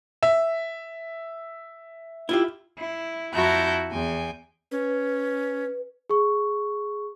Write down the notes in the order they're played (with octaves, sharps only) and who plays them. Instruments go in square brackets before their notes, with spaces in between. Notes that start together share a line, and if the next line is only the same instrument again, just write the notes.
[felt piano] E5
[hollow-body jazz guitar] E4 F4 G4
[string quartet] E4
F2 E4 F#4 A5 A#5 G6
E2 G5 G#5
[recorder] C#4 [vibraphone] B4
[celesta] G#4 C#6